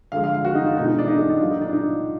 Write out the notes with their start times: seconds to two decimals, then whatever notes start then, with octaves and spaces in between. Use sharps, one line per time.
0.12 D3 F3 G#3 F5
0.24 F5
0.34 F5
0.45 F#4
0.55 D#4
0.66 F4
0.76 B2 G#3 D#4
0.87 D#4
0.98 D4
1.08 D#4
1.19 D#4
1.30 D4
1.40 A#2 F#3 F4
1.51 D#4
1.61 D4
1.73 D#4